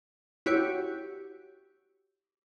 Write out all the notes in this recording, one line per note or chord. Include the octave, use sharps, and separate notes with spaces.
E4 F#4 G4 C#5